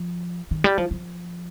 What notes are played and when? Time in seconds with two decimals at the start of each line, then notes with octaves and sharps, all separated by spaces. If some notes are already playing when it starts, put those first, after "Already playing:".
Already playing: F3
0.51 D#3
0.64 G3
0.78 F3
0.91 F3